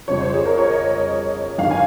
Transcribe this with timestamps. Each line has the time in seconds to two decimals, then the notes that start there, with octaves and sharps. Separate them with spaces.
0.08 F2 C#3 G3 C#5
0.21 C5
0.33 G#4
0.45 A#4
0.58 C#5
0.71 D#5
1.58 G1 G2 D#3 F5
1.71 G#5